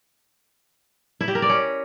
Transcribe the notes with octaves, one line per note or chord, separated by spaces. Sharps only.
E4
G4
A#4
D5
C#4